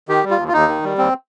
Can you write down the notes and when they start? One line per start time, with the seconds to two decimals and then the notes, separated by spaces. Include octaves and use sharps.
0.09 D#3 G4
0.24 G3
0.31 F4
0.38 D#2
0.48 F4
0.53 D#2 D#4
0.68 D#3
0.84 G3
0.98 D#2 C4